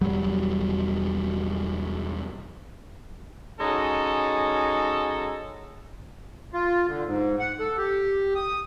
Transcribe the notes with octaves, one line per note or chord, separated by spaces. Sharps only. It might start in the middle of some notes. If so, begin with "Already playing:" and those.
E1 F#3 G3
G#3 C#4 D#4 F#4 A4
F4
D3
G#2
F#5
A4
G4
D#6